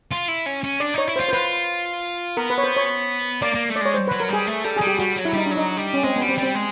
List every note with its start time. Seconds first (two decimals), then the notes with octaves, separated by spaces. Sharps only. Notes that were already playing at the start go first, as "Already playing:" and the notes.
0.11 F4
0.28 E4
0.46 C#4
0.64 C#4
0.80 D4 D5
0.94 D#4 C#5
1.08 E4
1.16 C5
1.20 F4
1.29 C5
1.32 F4 B4
2.37 B3 A#4
2.50 B4
2.58 C#5
2.64 C5
2.77 C#5
3.42 A#3 D5
3.55 A#3
3.68 A3
3.76 D5
3.81 G#3 C#5
3.94 C5
4.07 F#3 B4
4.20 A#4
4.29 G3 G#4
4.47 A3
4.64 G3 A4
4.76 G3 G#4
4.87 G4
4.98 G3 F#4
5.16 F#3
5.25 E4
5.33 G3 D#4
5.46 D4
5.51 F#3
5.57 D#4
5.77 G3
5.94 C#4
6.03 G#3 C4
6.16 G3 B3
6.29 C4
6.38 G3
6.43 C4
6.55 G#3